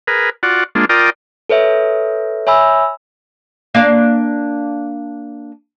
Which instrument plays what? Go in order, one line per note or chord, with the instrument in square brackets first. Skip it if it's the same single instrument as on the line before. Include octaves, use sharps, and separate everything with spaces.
[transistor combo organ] G#4 A#4 B4
F4 F#4 D5 F#5
G#3 A#3 D4 F4
F4 A#4 D5 G5 D#6
[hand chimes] A4 B4 C#5 E5
C#5 E5 G#5 B5 E6
[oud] A#3 D4 F5